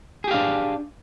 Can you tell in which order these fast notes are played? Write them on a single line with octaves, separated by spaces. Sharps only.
G#4 G4 F5 D4